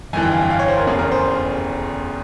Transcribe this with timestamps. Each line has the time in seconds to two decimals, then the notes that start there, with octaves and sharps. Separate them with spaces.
0.13 G1 F2 E3 G#5
0.23 G5
0.32 F5
0.41 G5
0.50 F5
0.59 C#5
0.68 C5
0.77 A#4
0.87 F1 E2 C#3 G#4
0.99 A#4
1.12 C5